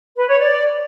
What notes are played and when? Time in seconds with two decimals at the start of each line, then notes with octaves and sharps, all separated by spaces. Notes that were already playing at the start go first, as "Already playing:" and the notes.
0.16 B4
0.28 C#5
0.39 D5